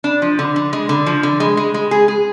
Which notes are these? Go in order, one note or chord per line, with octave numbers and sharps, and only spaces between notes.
D4
F3
D3
D3
G#3
D3
F3
D3
G#3
G#3
G#3
G#4
G#4